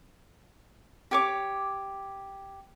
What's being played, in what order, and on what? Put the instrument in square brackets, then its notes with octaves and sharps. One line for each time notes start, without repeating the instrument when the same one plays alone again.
[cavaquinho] G4 C#5 D6